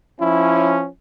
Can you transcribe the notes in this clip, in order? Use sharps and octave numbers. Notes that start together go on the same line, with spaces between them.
F3 C#4 E4